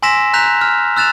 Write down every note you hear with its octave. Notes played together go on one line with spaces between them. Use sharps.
G#5 C6 E6 A#6 B6 E7
A#5 F#6 G6 B6 F7
F6
E6 F#6 A6 E7 F7